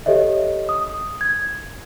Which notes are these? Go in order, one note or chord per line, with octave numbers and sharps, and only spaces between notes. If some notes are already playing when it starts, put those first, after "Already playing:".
G4 A4 C#5 D#5 E5
D#6
G#6